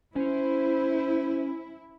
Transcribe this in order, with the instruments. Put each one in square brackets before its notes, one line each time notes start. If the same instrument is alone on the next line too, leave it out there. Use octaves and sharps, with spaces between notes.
[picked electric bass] C#4 [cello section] E4 [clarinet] C5